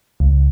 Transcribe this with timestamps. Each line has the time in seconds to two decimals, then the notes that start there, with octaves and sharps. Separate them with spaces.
0.20 C#2